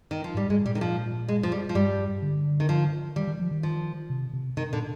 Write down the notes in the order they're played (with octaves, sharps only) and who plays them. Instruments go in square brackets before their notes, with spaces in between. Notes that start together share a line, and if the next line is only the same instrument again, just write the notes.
[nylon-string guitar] D#3
F3
[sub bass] G#2 [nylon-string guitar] G3
[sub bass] G#2 [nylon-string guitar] G#3
[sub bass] A#2 [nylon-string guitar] G3
[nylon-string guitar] D#3
F3
G#3
F3
G3
F3
[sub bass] G2 [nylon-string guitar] G3
[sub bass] D3
[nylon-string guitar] D#3
F3
[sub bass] D#3 [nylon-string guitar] G3
[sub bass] D#3
F3
D#3
[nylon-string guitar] F3
[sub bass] C3
C3
[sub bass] C3 [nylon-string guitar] D#3
[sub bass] A#2 [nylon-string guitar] D3